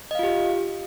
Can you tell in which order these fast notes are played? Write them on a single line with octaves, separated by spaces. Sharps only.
D#5 F5 F4 G4